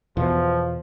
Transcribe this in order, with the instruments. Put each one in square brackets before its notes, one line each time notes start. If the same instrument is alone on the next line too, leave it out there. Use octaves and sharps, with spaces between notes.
[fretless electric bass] E2 B2 [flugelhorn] F3